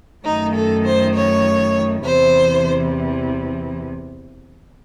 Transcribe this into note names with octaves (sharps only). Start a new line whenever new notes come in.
F#2 D#3 A3 D#4
A4
C5
C#5
E2 C3 E3 C5